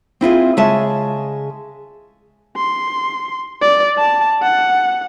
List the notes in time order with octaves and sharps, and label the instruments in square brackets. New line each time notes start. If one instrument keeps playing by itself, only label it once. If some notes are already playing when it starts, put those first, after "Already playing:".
[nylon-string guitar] C4 E4 F4 G#4
C#3 G#3 G#4 E5 A5
[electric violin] C6
D5
A5
F#5